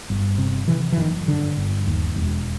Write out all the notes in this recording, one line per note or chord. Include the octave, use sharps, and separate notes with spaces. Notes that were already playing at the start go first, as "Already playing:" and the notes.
G1
C3
C3 E3
E3
F#1 D#3
G1 D3
G1
D#2
E1